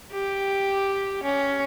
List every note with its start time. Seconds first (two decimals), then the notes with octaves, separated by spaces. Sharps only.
0.12 G4
1.23 C#4